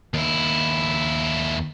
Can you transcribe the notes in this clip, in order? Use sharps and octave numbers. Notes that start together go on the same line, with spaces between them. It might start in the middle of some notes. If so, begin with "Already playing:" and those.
D#2 E4